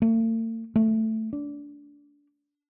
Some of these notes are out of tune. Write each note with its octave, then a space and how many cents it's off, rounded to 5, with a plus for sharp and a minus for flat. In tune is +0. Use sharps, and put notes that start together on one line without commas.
A3 +45
A3 +5
D4 -20